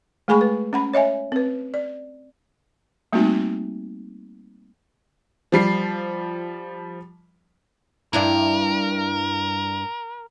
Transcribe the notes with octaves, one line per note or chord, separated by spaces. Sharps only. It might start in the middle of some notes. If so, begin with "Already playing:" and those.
G#3 A3 G#4 G#5 B5 C#6
B4
C#4 F#5 B5
C#5 D#5 E5 G#5
C4 B4
D5
G3 A3 A#3 C4 D#4 F#4
F3 G3 C7
G2 D4 E4 A#4